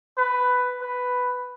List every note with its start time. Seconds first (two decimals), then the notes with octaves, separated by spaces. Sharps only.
0.18 B4
0.81 B4